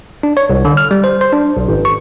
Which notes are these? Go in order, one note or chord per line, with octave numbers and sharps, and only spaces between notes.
D4
C#5
C2
D3
F6
G3
C5
C5
D4
B1
G#1
C#6